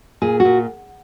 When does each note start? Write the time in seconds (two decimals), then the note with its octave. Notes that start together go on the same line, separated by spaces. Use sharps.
0.22 A#2 G#4
0.40 F#4
0.45 A#2